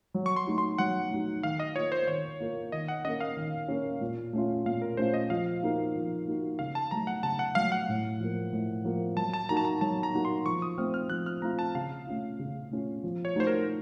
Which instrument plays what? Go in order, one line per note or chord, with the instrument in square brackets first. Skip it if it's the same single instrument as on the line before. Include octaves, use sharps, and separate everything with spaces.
[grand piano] F#3
[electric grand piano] C#6
C6
[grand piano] A3 D#4 F#4
[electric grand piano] C6
[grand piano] F#3 [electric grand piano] F#5
[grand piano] A3 D#4 F#4
[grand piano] D#3 [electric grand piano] F5
[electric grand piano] D#5
[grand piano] A#3 F4 [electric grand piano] C#5
[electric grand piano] C5
[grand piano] D#3 [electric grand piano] C#5
[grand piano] A#3 F4
[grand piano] D#3 [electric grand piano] D#5
[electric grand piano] F#5
[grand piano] A#3 C#4 [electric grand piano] D#5
[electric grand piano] F5
[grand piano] D#3
A#3 C#4
A#2
A3 C#4 F4
[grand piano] A#2 [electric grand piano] F5
[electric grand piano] A#4
[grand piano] A3 C#4 F4 [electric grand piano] C5
[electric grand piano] D#5
[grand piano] F3 [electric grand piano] F5
[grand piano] A#3 D#4 F#4
F3
A#3 D#4 F#4
[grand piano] C#3 [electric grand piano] F5
[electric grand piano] A5
[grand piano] F#3 A3 [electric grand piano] A#5
[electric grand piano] F#5
[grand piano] C#3 [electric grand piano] A5
[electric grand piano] F#5
[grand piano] F#3 A3 [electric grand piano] F5
[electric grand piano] F#5
[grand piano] A2
F3 A#3
A2
F3 A#3
[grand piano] F#3 [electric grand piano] A5
[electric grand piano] A5
[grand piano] A#3 D#4 F#4 [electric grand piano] A#5
[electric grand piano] A5
A#5
[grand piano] F#3 [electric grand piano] A5
[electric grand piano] A#5
[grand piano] A#3 D#4 F#4
[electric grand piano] C6
[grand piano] F3 [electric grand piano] C#6
[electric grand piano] D#6
[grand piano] A3 C4 F4 [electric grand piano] F6
[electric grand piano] F6
[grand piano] F3 [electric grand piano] F#6
[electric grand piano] F6
[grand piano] A3 C4 F4 [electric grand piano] A#5
[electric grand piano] A5
[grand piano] C#3 [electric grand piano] F5
[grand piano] A3 C#4 F4
C#3
A3 C#4 F4
F3
[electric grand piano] C#5
[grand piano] A3 D#4 F#4 [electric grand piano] C5
[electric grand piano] A#4